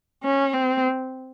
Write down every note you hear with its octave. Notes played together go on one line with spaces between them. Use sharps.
C#4
C4